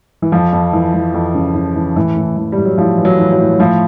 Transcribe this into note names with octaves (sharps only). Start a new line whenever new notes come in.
E3
F2 F3
F2
E3
E3
F2
C#3
C#3
E3
A2 E3
A2
E3
A2 G3
F#3
A2 F3
E3
F#3
E3
F#3
A2
A2 F3